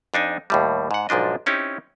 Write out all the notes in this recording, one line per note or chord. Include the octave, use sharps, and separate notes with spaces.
F2 D4 D#4 G#5
D#2 A2 G3
G#2 F#5
B1 G#2 F3 D4 D#5
C4 C#4 D#4 E4 G4